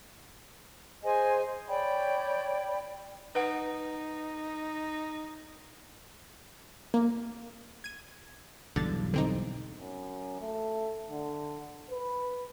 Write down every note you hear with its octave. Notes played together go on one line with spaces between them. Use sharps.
G#4 C5 D#5 G#5
C#5 D5 G5 B5
D#4 B4 F#5
A#3
G#6 D#7
B1 E2 G2 D3 A6
D3 C4 D#4
F#2
A3
D3
B4